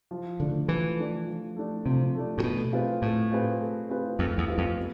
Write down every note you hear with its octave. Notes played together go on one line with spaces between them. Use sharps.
F3
D3 A3 D4
E3 F3
A3 D4
F3
A3 D4
C3 F3
A3 D4
A2
B2 A3
C4 F4 G#4 B4
A2 A3
C4 F4 G#4 B4
A3
C4 F4 G#4 B4
F2 A3
E2
C4 F4 G#4 B4
F2
B3